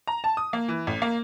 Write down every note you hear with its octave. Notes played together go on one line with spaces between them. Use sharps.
A#5
A5
D#6
A#3
E3
A1
A#3